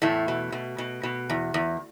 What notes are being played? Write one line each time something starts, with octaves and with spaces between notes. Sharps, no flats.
E2 A2 A3
B2
B2
B2
B2
E2
E2